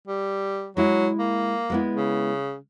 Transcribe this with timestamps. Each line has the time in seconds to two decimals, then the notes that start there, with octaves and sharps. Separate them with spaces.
0.07 G3
0.77 F#3 G#3 E4
1.19 A#3
1.70 G#3 B3 E4
1.95 C#3